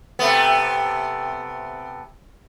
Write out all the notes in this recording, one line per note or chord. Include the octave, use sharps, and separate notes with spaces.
C3 A3 B3